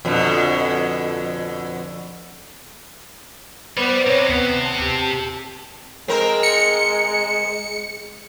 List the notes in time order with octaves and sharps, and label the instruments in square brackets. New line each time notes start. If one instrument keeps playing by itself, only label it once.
[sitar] F2 B2 D3
[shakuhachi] B3 [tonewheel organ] B4 C5 [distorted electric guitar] D5 B5
[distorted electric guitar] C3 [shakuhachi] C#5
[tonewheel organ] D#2 [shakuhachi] B3
[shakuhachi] A5
[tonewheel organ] G4
[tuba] G#3 [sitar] C4 A#4
[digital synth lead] C#7